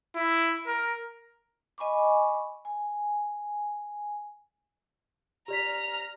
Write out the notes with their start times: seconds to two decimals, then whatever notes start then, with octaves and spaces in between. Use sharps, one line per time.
0.16 E4
0.67 A#4
1.78 D#5 G#5 B5 C#6 D6
2.65 G#5
5.48 G4 D5 A#5 F6 B6